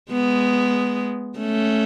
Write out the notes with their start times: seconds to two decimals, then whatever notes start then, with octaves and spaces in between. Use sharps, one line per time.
0.12 G#3 B3
1.39 A3 C#4